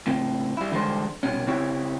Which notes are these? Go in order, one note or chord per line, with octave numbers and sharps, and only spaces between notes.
A2 C#3 C4
G3 E4
D3 E3 G3 G#3 A4 C5
C2 B2 C#4
C#3 C4 E4 G4 C#5